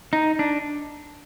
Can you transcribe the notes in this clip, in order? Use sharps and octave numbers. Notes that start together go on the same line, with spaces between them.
D#4
D4